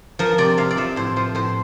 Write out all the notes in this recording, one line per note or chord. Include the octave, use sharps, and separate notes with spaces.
F3 A#4
C3 D5
C3 F5
D5
F3 E5
A2 C5
F3 C5
A2 C5